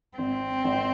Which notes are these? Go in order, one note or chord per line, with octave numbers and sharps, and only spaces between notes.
G#1 C4
G#1